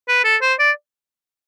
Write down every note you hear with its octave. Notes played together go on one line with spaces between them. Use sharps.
B4
A4
C5
D5